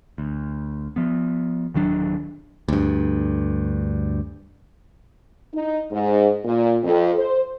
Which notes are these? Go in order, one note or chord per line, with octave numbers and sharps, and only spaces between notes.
D2
F3 B3
D1 D#3 F#3 D4
D2 G2
D#4
G#2
A#2
F2
C5